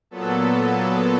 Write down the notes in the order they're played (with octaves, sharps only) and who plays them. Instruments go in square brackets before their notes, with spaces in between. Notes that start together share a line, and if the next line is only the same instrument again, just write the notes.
[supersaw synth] A#2 F#3 B3 A4